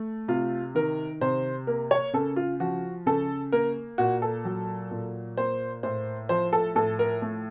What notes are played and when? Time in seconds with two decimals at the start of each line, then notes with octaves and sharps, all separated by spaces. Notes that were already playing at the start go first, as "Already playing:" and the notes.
Already playing: A3
0.28 C3 F4
0.75 D#3 A#4
1.21 C3 C5
1.67 A#3 A#4
1.91 C#5
2.13 C#3 A4
2.36 F4
2.60 F3 F#4
3.06 C#3 A4
3.52 A#3 A#4
3.98 A#2 F#4
4.22 A4
4.45 F#3
4.91 A#2
5.37 A#3 C5
5.83 A2 C5
6.29 F3 C5
6.53 A4
6.75 A2 A4
6.99 A#4
7.22 A3